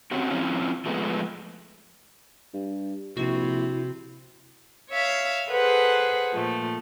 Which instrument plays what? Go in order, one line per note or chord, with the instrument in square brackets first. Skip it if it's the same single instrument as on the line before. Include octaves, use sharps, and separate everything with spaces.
[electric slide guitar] C4 C#4 F#4 G4
F3 C4 C#4 E4 F4
F3 G#3 A3 B3
[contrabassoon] G2
[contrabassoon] A#1 [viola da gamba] C3 [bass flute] E4 [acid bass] F#4
[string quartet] C#5 E5 F5
G#4 A4 B4 C5 F#5
A#2 F3 A3